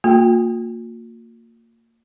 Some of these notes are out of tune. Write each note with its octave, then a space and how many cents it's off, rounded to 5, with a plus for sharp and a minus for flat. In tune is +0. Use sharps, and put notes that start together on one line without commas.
A#3 -25 F4 +40 G5 +0